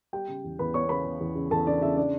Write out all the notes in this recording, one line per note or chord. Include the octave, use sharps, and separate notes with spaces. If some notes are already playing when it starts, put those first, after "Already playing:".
G3 G4 G5
C#3
E2
E2 B4 B5
B3 C#5 C#6
C#3 B4 B5
C#3
E2
C#3
E2 A4 A5
C#3 D4 D5
C#3 E4 E5
D4 D5